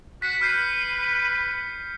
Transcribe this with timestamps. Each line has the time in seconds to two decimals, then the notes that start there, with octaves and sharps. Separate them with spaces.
0.22 F#4 B6 C#7
0.42 B4 F6 G6 C7